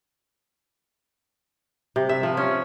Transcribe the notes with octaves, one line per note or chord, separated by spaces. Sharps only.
C3
E5
F3
C#4